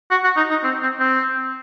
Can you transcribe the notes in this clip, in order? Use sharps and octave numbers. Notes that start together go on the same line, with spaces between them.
F#4
F#4
D#4
D#4
C4
C4
C4